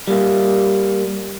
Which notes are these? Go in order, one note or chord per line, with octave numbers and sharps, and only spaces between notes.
G3 A#3